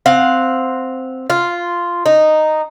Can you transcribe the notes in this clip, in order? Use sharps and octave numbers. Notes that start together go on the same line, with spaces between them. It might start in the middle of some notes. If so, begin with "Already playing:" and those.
C4 F5 F#5
F4
D#4